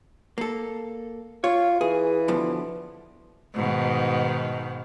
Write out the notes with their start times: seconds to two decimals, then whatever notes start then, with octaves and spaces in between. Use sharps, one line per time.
0.38 A#3 A4
1.44 F4 C#5
1.81 E3 G#4
2.28 B2 D3 F3
3.55 G#2 B2 D#3